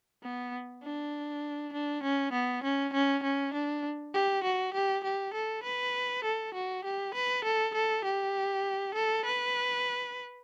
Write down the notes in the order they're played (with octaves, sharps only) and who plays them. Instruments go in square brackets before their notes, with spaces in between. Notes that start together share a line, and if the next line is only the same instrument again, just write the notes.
[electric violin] B3
D4
D4
C#4
B3
C#4
C#4
C#4
D4
G4
F#4
G4
G4
A4
B4
A4
F#4
G4
B4
A4
A4
G4
A4
B4